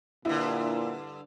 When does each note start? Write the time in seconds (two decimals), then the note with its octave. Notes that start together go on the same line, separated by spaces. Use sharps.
0.25 G2 A#2 D3 E4